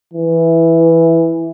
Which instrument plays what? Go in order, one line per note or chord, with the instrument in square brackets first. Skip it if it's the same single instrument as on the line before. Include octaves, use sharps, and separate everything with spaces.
[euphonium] E3